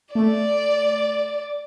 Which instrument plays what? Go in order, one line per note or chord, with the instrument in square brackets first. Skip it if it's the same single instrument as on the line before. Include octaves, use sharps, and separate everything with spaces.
[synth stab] A3 [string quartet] D5